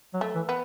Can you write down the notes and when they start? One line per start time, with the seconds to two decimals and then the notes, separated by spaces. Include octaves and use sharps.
0.14 F#3
0.21 A3
0.35 E3
0.49 B3